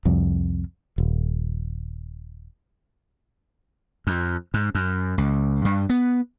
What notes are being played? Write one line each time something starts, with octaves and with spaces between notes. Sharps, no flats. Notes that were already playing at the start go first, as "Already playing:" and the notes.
C2 F2
D#1
F2
G#2
F#2
C#2
G2
B3